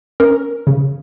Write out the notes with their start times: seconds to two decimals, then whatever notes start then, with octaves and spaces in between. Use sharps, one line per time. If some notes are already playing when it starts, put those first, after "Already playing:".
0.20 C#4 A#4
0.67 C#3